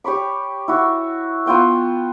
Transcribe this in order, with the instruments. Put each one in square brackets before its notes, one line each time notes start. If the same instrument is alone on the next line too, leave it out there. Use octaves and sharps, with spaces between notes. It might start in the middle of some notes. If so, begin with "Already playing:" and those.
[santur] G4 C#5 B5 D6
E4 F#4
B3 F4 G5 C#6